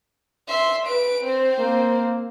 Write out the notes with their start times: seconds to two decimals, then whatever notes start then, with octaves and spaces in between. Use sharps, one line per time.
0.49 E5 C6
0.86 B4 D7
1.24 C4 C5
1.59 A#3